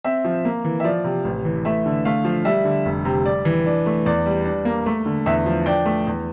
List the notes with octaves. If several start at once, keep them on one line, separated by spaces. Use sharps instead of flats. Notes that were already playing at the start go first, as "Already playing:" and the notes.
C4 E5
F3
A#3
E3
E5
F3 D5
C3
A1
E3
A3 E5
D3
A3 F5
F3
G3 E5
D3
F1
C3
G3 D5
E3
D4
A3
E2 D5
G3
D4
A#3
A3
D3
E2 E5
F3
D4 G5
A3
E2